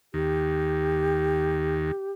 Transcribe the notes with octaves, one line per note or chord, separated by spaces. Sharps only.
D#2 G4